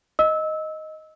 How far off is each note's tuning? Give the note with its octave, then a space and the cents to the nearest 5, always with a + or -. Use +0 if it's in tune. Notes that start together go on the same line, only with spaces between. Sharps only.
D#5 +5 E6 -20